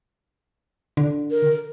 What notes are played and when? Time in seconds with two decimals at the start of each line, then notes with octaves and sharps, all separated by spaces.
0.97 D3
1.31 A#4